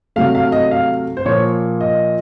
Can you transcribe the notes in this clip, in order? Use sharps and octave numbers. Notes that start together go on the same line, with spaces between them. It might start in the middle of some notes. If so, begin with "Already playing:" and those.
C3 F#3 A3 F5
F5
D#5
F5
C5
A#2 F3 A#3 C#5
D#5